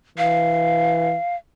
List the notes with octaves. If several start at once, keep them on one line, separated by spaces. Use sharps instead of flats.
E3 F5